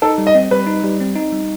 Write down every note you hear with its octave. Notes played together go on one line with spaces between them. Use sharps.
D#4 A4
G3
D#5
C4
G3 B4
D#4
G3
C4
D#4
G3